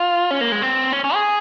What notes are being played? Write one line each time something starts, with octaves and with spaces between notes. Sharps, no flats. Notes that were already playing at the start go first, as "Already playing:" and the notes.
Already playing: F4
C#4
A#3
G#3
C4
C#4
C#4
G#4